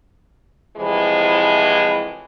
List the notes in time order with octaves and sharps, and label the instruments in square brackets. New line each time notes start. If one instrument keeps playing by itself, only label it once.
[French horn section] A2 C3 E3 F3 G#3 E4